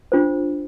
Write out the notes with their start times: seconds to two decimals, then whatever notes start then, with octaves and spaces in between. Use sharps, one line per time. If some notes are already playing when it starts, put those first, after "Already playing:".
0.12 D4 F4 C5